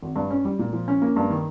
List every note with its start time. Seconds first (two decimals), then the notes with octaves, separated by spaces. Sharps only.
0.02 G#1
0.16 G2
0.30 C#4
0.45 G3
0.59 A#2
0.73 F3
0.88 C#4
1.02 A#3
1.16 G2
1.30 D#3